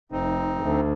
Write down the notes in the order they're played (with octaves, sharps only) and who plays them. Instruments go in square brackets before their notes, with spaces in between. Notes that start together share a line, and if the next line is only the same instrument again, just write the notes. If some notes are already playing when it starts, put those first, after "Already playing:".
[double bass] F1 [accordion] C4 D#4
[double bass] D2